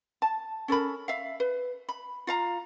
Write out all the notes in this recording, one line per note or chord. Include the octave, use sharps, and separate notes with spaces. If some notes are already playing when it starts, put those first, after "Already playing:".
A5
C#4 A4 A#4 B5
E5 F5
B4
B5
F4 F5 A#5